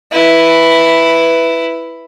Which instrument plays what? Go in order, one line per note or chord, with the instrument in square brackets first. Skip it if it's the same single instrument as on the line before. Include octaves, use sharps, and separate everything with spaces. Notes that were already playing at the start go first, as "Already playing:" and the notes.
[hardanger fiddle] E4 B4